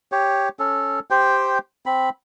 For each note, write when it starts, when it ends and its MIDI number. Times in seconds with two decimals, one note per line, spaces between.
0.12 0.49 67
0.12 0.49 73
0.59 1.00 61
0.59 1.00 69
1.10 1.58 67
1.10 1.58 72
1.10 1.58 79
1.86 2.10 60
1.86 2.10 83